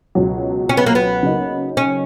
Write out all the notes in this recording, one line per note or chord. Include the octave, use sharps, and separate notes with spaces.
C#2 B2 F#3
C#4
B3
A#3
B3
C#3 F#3 A#3 D#4
C#4